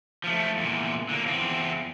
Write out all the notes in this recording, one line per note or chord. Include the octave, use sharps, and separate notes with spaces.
F3 A3
E2 A#2
D3 A#3
E2 C4